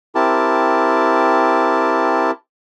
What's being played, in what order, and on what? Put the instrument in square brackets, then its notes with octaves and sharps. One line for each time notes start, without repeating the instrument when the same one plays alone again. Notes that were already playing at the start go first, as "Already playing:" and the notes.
[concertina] C4 E4 G4 A#4 A5